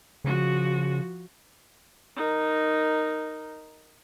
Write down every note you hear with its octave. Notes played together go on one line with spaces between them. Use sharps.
C#3 F3 F#4
D#4 A#4